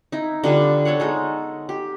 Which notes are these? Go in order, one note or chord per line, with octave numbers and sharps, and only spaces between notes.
D#4 E4
D3 G3 B3 F4
B3 A4 C#5 F#5
G#3 D#4 A4
G4